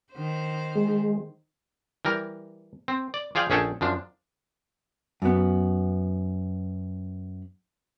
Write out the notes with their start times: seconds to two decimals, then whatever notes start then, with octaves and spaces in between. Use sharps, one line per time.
0.13 D#3 C5
0.75 G#3
2.05 E3 G3 A#4
2.88 C4
3.14 D5
3.35 F3 G#4 D5 F5 G5
3.50 A#1 C#4 G#4 A4 G5
3.81 F#2 F3 D4
5.22 F#2 B3